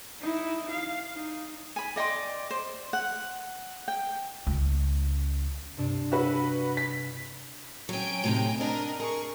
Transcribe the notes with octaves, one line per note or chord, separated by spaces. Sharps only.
D#4 E4
F5
D#4
G#5 B5
D5 D#5 G5 C6
C5
F#5
G5
C#2
G2 C3 D4
F#4 B4 E5
B6
F#3 C#4 G5 G#5 D7
A2 C3 D#4
C4 D4 A#4 D#5
G#4 A#4 C#6